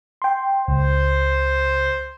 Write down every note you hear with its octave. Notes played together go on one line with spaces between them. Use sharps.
G5 C6
C#2 C5